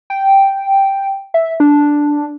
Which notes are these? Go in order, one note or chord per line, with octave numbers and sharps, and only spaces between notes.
G5
E5
D4